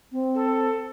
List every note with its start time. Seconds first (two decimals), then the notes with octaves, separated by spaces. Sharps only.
0.11 C4
0.34 A4